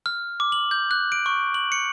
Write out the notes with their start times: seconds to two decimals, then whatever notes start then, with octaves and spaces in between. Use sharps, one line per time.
0.06 F6
0.40 D6
0.52 F#7
0.71 G6
0.91 F#6
1.12 D7
1.26 C#6
1.54 F#7
1.72 C#7